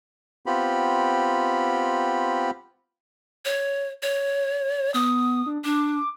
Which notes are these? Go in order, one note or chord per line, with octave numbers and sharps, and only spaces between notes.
B3 C4 F4 G4 B5
C#5
C#5
B3 D#6
D4
D4 D6